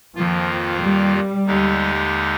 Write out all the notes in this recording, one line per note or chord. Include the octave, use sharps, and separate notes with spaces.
F2 D#3 F3 A#3 F4
G3
D#2 D3 G#3 D#4 G4